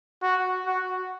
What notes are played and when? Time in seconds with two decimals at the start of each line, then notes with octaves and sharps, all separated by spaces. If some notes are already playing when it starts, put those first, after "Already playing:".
0.23 F#4
0.66 F#4